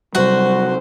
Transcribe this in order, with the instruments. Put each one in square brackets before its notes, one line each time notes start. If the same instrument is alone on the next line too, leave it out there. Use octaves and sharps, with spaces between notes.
[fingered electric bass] C3 F#3 [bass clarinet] G3 [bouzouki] F#4 [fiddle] C5